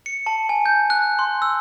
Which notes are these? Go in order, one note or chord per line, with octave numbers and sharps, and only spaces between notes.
C#7
A5
G#5
G6
F#6
C6
E6